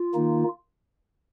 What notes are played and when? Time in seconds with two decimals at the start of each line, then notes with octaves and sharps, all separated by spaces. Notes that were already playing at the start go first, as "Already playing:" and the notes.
Already playing: F4
0.14 D#3 A#3 D#4